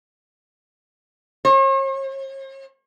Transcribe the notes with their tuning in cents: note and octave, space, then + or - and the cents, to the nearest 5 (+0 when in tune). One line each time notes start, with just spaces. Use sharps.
C#5 -45